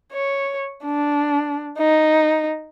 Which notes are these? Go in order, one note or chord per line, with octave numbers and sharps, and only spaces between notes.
C#5
D4
D#4